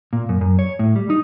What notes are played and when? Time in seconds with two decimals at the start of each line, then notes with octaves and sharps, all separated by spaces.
0.13 A#2
0.29 F#2
0.41 F#2
0.59 C#5
0.79 A2
0.96 G3
1.10 D#4